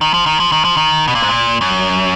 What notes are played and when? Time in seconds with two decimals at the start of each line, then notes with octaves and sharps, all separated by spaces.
0.01 D#3
0.14 F3
0.26 D#3
0.40 F3
0.52 D#3
0.65 F3
0.77 D#3
1.07 B2
1.15 A#2
1.22 G#2
1.29 A#2
1.61 F#2